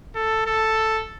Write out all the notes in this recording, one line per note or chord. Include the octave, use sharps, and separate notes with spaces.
A4
A4